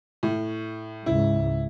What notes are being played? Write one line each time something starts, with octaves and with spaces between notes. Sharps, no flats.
A2
C#2 G#2 E4